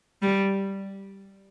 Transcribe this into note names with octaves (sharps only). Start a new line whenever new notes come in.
G3